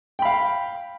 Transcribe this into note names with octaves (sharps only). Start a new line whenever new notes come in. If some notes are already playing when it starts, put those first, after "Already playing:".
F5 G5 B5